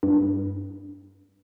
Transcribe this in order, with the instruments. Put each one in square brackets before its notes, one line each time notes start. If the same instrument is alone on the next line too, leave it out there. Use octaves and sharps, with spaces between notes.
[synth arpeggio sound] G2